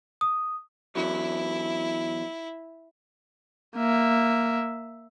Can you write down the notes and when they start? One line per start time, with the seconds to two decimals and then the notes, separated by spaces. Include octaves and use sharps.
0.21 D#6
0.95 E2 F#3 E4
3.77 A#3 E5